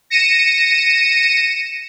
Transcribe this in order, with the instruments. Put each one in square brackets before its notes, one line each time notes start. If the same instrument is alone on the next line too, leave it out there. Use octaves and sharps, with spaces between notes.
[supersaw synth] A#6 C#7 D#7 E7